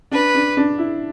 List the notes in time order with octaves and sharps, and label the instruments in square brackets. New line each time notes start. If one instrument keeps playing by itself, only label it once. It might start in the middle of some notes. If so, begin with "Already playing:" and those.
[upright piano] D4 [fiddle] B4
[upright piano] D4
D4
E4